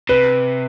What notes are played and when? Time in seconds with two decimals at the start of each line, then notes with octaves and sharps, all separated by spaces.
0.09 C3 B4